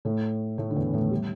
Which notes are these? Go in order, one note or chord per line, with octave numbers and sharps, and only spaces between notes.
A2 A3
A2 A3
D3
E2 E3
A2 A3
G3